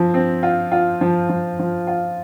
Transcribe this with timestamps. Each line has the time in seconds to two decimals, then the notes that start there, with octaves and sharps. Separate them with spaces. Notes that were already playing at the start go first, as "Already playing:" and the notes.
Already playing: F3 C4
0.14 C4
0.43 F4
0.72 F4
1.01 F3
1.29 F3
1.59 F3
1.87 F4